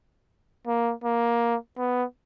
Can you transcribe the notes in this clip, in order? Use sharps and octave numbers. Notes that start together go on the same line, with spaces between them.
A#3
A#3
B3